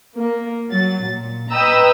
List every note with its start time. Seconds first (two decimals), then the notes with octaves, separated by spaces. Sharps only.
0.16 A#3
0.68 F#3 A6
1.06 A#2
1.52 B4 D#5 G5 A#5 D#6 E6